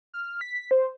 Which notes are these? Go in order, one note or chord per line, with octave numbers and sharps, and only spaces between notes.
F6
B6
C5